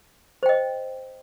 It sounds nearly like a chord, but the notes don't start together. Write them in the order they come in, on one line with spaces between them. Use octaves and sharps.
C5 G5 D#5